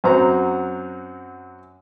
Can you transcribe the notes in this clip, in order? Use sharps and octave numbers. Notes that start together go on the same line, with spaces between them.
F#2 F#3 C4 A#5